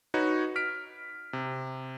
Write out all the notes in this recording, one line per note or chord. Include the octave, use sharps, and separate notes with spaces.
D#4 F#4 B4 C#5
F6 B6 D7
C3